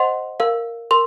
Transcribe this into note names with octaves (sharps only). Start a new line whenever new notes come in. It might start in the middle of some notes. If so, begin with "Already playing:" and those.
Already playing: C5 D#5 F#5 C6
A#4 F5
A#4 C6